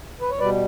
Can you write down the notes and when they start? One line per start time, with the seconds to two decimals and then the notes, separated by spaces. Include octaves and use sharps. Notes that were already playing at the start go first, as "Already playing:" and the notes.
0.21 B4
0.30 C#5
0.39 B2 G3 B4 D5